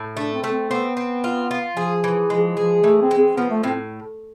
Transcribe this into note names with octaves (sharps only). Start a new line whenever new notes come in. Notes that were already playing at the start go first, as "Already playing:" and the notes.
Already playing: A2
A3 D4
C4
A3
C4
B3 C4
C4
F4
F4
F3 G#4
E3
F3 G#3
F3 G#4
E3 A3
C4
G#3
C4
F3 B3
A3
A2 C4